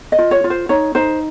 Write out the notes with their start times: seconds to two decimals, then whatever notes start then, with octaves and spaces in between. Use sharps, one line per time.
0.12 D#5
0.19 F4
0.31 C#5
0.44 F4
0.50 C5
0.69 D#4 C#5
0.95 D#4 C5